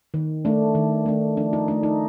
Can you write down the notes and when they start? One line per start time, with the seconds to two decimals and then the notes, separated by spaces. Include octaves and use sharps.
0.14 D#3
0.45 A3 D4
0.75 D#3
1.06 A3 D4
1.37 F3 D4
1.53 D#4
1.68 A3 D4
1.83 D#4